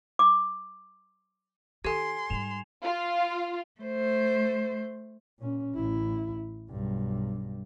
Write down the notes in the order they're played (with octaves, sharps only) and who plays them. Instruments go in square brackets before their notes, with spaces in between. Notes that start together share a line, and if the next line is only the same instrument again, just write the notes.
[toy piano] D6
[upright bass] D#3 [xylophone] G4 A4 [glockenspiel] G#5 G#6 [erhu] C6
[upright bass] G#2 G3 [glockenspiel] E7 F7
[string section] F4
[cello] A3 C5
[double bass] A#2 C#4
A1 E4
B1 G2